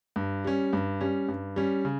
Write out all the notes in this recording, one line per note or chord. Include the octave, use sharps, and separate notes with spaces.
G2
G3 C#4
G2
G3 C#4
G2
G3 C#4
C#3